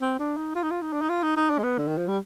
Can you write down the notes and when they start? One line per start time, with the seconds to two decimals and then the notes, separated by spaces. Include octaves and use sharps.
0.01 C4
0.19 D4
0.37 D#4
0.55 F4
0.63 D#4
0.71 F4
0.82 D#4
0.93 D4
1.01 D#4
1.09 F4
1.23 D#4
1.36 D#4
1.50 D4
1.59 G#3
1.63 B3
1.78 D3
1.88 D#3
1.98 F3
2.08 G3